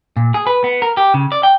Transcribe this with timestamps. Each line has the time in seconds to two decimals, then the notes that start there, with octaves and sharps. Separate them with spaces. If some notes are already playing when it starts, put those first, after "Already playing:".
0.17 A#2
0.34 G#4
0.47 B4
0.64 B3
0.82 A#4
0.97 G4
1.14 C#3
1.32 D5
1.43 G5